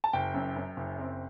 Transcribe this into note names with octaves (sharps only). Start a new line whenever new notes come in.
A5
F#1 G5
F#2
F#2
F#1
C4